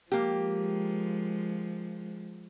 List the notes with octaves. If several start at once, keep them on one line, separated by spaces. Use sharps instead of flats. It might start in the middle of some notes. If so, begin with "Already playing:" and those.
F3 G#3 A#3 G4